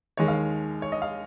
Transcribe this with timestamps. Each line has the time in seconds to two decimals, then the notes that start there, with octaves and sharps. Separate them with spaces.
0.17 D#2 D#3 G#3 C#5
0.28 F5
0.82 C#5
0.92 D#5
1.02 F5